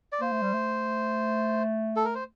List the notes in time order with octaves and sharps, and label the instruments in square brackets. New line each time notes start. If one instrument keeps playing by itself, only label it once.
[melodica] D5
[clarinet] A#3 [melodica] C5
[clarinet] A3
G3
A3
[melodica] A4
A#4
C5